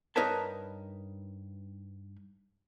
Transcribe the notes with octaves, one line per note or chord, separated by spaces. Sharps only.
G2 D#4 A#4 B4 C#5 A5